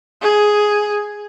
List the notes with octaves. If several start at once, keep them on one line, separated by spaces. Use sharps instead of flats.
G#4